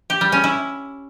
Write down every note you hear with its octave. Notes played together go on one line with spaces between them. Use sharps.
G4
G3
C#4
E4